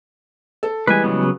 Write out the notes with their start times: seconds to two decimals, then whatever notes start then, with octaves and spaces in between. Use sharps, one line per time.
0.63 A4
0.87 E3 G3 G#3 B4 G#5
1.04 C#3 F#3 B3